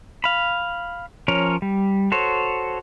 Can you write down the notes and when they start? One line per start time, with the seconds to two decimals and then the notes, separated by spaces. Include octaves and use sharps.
0.24 F5 B5
1.28 F3 C#4 A#4 C#5
1.62 G3
2.12 F#4 A4 C5 C#5